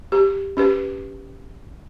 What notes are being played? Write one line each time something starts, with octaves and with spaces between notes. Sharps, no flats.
G4
C#4 G4 B4